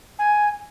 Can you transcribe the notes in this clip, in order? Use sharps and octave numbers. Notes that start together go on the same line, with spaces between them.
G#5